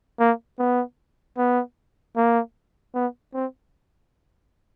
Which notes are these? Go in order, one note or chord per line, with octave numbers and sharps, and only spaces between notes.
A#3
B3
B3
A#3
B3
C4